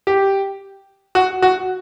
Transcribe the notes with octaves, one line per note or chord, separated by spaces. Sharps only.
G4
F#4
F#4